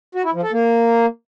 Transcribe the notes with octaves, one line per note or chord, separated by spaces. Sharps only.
F#4
E4
F3
A4
A#3